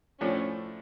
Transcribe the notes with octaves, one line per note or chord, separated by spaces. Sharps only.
A2 F3 A3 C#4 D4